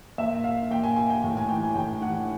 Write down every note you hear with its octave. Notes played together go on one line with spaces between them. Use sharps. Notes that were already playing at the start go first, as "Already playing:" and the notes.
A#2 E5
F5
A#2 G5
G#5
G#5
G5
A2
G#5
E3 G5
G#5
A2 G5
E3 F#5